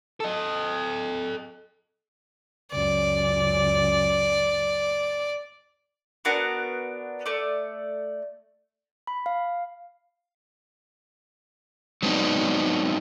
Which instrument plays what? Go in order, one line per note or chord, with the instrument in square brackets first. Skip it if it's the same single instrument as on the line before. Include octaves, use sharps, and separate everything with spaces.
[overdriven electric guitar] A4 D#5
[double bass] C#2 F#2 [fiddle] D5
[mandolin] B3 D4 F#4 A#4
A3 D5
[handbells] B5
F5
[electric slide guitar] F#3 G#3 B3 C4 D4 D#4